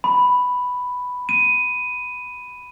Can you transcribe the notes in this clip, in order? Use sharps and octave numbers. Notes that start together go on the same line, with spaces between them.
B5
D#7